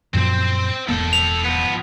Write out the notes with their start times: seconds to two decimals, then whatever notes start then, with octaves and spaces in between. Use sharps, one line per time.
0.14 F#2 A#2 F3 C4 C5
0.89 E1 A#3 A4 G5
1.13 F7
1.44 F3 B3